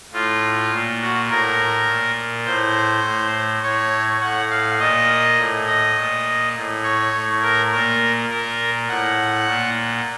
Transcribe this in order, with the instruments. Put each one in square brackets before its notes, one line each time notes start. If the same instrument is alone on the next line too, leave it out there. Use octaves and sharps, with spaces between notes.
[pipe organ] A2 F4
A#2
F#4
A2 A#4
A#2
A2 C5
A2
A2 C#5
A2 F#5
F5
A#2 D#5
A2
D#5
A#2
A2
C#5
A2
A#4
A#2 A#4
A#2 A#4
A2 F#5
A#2